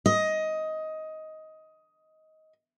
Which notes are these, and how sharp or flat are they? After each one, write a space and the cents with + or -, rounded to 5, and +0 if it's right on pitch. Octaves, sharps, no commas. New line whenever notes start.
D#5 +15